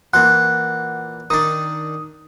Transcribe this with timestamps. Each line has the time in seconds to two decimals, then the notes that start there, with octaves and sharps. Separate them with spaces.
0.13 A#2 E3 F#5 C6 F#6
1.30 D#3 D4 D#6